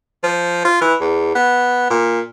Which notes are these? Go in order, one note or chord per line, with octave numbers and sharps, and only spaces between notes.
F3
F4
E3
E2
B3
A#2